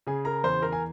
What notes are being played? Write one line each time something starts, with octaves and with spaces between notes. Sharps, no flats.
C#3 G#4 G#5
A#4 A#5
E2 C5 C6
A#4 A#5
G#5